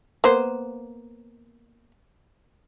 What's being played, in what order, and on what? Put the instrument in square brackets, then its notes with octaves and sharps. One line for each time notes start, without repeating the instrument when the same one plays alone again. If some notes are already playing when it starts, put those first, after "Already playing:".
[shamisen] A#3 B3 C5